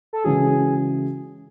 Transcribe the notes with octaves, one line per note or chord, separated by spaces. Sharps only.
A4
C#3 E3 G#3 C#4 F#4 G#4